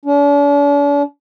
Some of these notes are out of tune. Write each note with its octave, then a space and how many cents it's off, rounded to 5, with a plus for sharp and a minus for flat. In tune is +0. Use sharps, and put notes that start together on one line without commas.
D4 -45